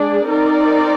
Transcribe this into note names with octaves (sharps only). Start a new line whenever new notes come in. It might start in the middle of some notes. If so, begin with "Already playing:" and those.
Already playing: G#3 D4 G#4 D5
C4 D#4 A#4 D5